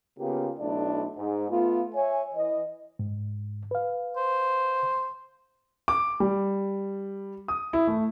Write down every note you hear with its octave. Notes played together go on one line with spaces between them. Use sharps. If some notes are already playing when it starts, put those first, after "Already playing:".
C#3 A#3 B3 F4 G4
B1 A3 D4 E4 D5
G#2
A3 B3 F4
C#5 E5 G#5
E3 D#5
G#2
B4 F5
C5
D6
G3
D#6
E4
A3